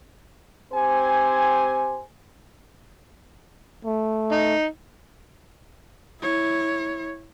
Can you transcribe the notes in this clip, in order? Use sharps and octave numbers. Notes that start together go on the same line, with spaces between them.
C4 G4 C5 G#5
A3
D#4
E4 C#5